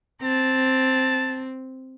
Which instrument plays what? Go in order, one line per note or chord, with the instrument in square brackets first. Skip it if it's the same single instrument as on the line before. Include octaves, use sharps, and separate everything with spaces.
[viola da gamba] C4 [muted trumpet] A5